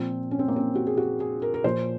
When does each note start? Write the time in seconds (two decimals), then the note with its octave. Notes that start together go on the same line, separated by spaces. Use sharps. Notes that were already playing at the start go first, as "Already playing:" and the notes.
Already playing: A#2 F3 C4
0.31 C#4
0.39 C4
0.48 A#3
0.56 C4
0.75 F#4
0.87 G#4
0.97 F#4
1.20 G#4
1.42 A#4
1.54 A#4
1.64 A#2 F3 C5